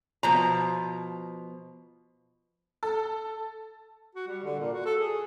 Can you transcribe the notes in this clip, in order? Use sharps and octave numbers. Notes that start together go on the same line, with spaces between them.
B2 F3 A#5
A4
F#4
G3
D3
A#2
F#4
A4
G#4